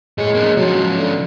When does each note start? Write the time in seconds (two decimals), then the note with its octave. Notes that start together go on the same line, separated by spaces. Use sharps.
0.18 A2 G#3 C#5
0.34 A#3 D4
0.57 C#3 F3 F#3
0.98 D3